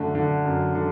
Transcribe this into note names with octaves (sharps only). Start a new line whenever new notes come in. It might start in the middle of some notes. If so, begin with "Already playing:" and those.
Already playing: F#2 D3 A3
D3
F#2
D3